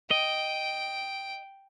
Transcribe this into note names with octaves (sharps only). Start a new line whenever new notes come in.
D#5 G5